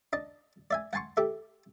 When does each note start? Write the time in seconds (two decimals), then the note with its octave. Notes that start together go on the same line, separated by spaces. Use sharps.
0.13 D4 D#5 A5
0.71 D5 E5 G#5
0.93 F#5 G#5 A5 C6 C#6
1.17 G4 A4 E5